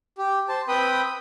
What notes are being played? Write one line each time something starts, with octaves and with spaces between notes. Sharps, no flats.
G4
C5 A5
C4 B4 G5 B5 D#6